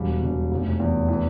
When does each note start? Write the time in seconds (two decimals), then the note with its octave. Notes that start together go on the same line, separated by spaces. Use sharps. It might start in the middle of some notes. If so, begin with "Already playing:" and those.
Already playing: E1 G3
0.22 E1
0.52 F1
0.80 E2
1.08 E3